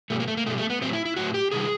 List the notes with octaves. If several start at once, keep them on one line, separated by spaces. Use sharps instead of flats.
B2 G3 A3
A#3
A3
A#3
B2 G3 A3
A3
B3
A2 F#3 C4
E4
E4
A2 F#3 F#4
G4
C3 D#3 G3 G#4